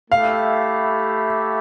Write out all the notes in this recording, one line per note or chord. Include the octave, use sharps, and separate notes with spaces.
A3 E4 G4 F5